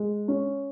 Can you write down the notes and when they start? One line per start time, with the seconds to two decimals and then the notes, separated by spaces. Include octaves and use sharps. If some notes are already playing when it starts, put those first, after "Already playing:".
Already playing: G#3
0.28 C#4